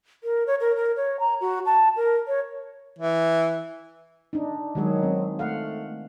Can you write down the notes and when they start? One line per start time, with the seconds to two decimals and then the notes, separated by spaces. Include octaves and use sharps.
0.24 A#4
0.47 C#5
0.60 A#4
0.76 A#4
0.96 C#5
1.20 A#5
1.41 F#4
1.66 A5
1.96 A#4
2.27 C#5
2.99 E3
4.33 D4 D#4
4.75 D#3 F#3 G#3 G#4
5.03 C4
5.39 A3 F5 F#5